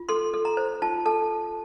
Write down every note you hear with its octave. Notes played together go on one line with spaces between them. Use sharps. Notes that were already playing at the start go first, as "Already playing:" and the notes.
Already playing: F4
A4 C6
A4
A#5
C5
F4 A5
A4 A5